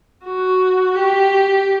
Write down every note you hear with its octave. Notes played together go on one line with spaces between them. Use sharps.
F#4
G4